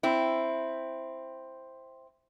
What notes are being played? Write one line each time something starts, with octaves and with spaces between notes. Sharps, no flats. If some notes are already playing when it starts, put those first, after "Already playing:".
C4 E4